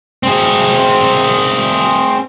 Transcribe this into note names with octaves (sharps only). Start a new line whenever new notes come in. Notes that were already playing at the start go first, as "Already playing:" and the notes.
C4 G#4